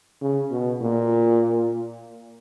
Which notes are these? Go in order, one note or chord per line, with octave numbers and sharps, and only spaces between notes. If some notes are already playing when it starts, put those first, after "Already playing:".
C#3
B2
A#2